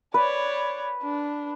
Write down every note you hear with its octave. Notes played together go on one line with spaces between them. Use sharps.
B4 C#5 D5
D4